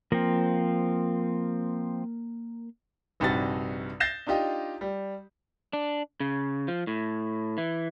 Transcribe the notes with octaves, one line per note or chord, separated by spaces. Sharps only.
F3 A#3 C4 A#4
A#1 G2 C3 D#4 F#4 A6
G6 A6 A#6 C7 E7
D4 D#4 F4 G4 D#5
G3
D4
C#3
F3
A2
E3